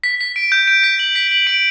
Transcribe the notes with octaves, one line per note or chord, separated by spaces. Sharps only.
B6
B6
D7
G6
D7
B6
F#7
B6
F#7
D7